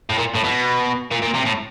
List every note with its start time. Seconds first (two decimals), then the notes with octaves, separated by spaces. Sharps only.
0.10 A2
0.18 A#2
0.35 A2
0.44 B2
1.12 A#2
1.22 A#2
1.34 C3
1.46 A2